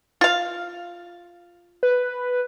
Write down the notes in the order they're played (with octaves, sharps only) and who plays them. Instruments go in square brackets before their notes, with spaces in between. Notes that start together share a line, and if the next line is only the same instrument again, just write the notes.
[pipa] F4 F5
[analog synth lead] B4